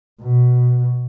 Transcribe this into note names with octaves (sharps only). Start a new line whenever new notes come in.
B2